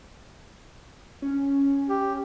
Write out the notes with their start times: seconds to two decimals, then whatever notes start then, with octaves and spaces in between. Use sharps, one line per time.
1.22 C#4
1.89 G4